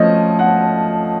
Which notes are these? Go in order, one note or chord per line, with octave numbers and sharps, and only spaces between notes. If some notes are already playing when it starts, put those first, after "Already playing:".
Already playing: F3 A3 C#4 D#5
F#5